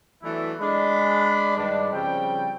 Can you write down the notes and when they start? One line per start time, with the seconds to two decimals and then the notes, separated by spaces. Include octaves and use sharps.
0.23 E3 F#3 A3 B3 D4 E4
0.60 G#3 D4 B5
1.56 G2 D#3 G#3 D4
1.92 C#3 F3 G3 C4 G5